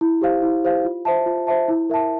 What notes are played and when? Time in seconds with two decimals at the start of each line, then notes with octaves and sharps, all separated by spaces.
0.01 E4
0.21 G4 C5 F5
0.42 E4
0.64 G4 C5 F5
0.85 F4
1.05 C5 E5 A5
1.26 F4
1.47 C5 E5 A5
1.68 E4
1.90 A#4 E5 A5